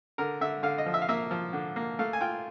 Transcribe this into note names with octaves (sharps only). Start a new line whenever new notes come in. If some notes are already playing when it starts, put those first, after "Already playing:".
D3 A#4
D3 E5
D3 F5
D#5
F3
E5
F5
A#3 E5
F3
D3
A#3
A3 F5
G#5
F4 G5